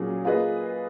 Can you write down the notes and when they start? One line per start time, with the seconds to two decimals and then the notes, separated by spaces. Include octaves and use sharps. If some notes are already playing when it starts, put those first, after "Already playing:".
Already playing: A#2 F#3 C#4 G#4
0.24 A#3 F4 G#4 B4 D#5